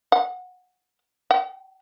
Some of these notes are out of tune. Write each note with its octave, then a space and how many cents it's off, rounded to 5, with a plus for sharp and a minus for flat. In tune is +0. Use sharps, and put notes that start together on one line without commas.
F#5 -20
F#5 +45